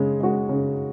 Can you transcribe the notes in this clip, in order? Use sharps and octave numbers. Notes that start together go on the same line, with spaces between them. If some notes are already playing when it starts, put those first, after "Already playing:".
Already playing: C#3 G#3
G#3 F#4
C#3